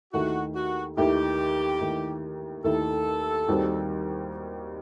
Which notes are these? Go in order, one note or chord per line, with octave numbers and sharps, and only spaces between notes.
D#2 D#3 A3 E4 F#4
F#4
D#2 D#3 A3 E4 G4
D#2 D#3 A3 E4
D#2 D#3 A3 E4 A4
D#2 D#3 G3 C4 F#4